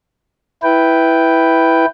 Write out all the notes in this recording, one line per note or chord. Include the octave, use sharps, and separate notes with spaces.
E4 B4 G5